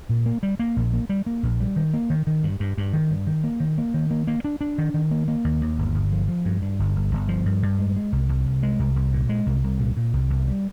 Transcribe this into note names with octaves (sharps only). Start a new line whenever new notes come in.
A#2
A#3
G3
A#3
A#1
A#3
G3
A#3
A#1
G3
D#3
A#3
D#3
D#3
G2
G2
G2
D#3
G2
D#3
A#3
D#3
A#3
D#3
A#3
A#3
D4
D4
D#3
D#3
A#3
A#3
D#2
D#2
G1
G1
F3
F3
G2
G2
G1
G1
G1
F3
G2
G2
G#3
G#3
C2
C2
C2
G#3
C2
C2
A#2
G#3
C2
C2
A#2
A#2
C2
C2
G3